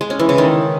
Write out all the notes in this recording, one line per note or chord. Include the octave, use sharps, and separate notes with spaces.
G#3
C#4
E3
C#3
D#3